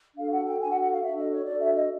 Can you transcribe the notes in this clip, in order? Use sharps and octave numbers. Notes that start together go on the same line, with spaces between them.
D4 F#4 A4 F5
F#5
G5
D4 F#4 A4 G#5
F#5
F#5
F5
D4 F#4 A4 E5
D#5
C#5
D4 F#4 A4 D5
E5
D#5